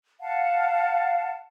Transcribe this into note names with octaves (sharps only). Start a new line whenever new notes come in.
F5 F#5 A5